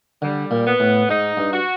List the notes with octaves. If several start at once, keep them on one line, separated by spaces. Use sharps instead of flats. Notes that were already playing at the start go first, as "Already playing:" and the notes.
D3 G3
A#2
B3
A2
G#2 D#4
G2
F#4